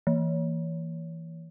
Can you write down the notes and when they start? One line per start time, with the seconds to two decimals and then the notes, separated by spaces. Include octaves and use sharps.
0.07 E3